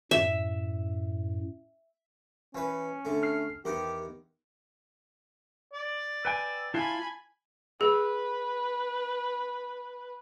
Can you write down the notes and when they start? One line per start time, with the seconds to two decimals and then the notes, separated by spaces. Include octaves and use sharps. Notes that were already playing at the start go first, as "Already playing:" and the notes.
0.11 F#2 A2 E5
2.55 E3 C#4 B4 G#5
3.05 D3 A3
3.23 F6 C7
3.65 E2 D#3 G4 A#4 F#5
5.73 D5
6.25 B4 G5 G#5 E6
6.74 E4 F4 G#5 A5 B5
7.81 G#4 B4